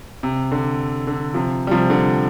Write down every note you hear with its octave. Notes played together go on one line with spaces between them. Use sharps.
C3
D3
D3
C3 F3
G3
C3 F3
D3